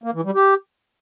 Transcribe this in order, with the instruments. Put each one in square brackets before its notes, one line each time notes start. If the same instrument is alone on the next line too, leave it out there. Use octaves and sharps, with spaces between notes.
[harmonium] A#3
E3
G3
G4